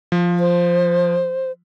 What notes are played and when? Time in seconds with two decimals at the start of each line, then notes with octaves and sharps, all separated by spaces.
0.12 F3
0.40 C5